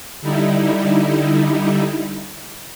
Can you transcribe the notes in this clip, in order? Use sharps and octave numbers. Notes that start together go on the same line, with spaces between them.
D3 G3 D#4 E4